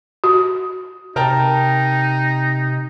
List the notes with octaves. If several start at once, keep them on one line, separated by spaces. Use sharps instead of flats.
F#4
C3 D#4 A#4 G5 A5